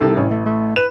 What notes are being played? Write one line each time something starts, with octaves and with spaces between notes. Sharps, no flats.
C2 C3 D#3 A4
A1 C#4
A3
A3
B4 E7